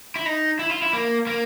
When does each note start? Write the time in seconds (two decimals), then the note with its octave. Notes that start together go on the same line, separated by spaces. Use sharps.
0.16 E4
0.26 D#4
0.59 E4
0.71 F4
0.82 E4
0.93 A#3
1.27 A#3